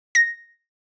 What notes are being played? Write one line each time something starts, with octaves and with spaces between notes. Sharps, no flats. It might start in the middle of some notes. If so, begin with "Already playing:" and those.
A#6